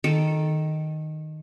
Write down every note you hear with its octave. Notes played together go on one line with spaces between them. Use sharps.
D#3 A4